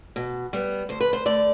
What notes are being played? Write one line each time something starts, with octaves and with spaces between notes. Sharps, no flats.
B2
G3 B3
D2 C5
B4
C5
D3 A3 D5